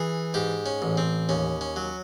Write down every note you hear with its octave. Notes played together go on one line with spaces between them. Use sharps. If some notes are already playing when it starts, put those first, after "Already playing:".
Already playing: E3 G#4
G#2 G4
C#4
A1
C4
D#2 C#4
C#4
F#3